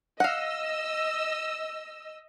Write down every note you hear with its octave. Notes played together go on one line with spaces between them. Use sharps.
D#5 F5 F#5 E6